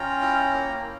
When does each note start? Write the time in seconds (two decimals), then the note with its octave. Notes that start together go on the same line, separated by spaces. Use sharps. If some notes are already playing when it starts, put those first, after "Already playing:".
Already playing: C#4 F4 G5 A#5
0.21 E4
0.53 A#3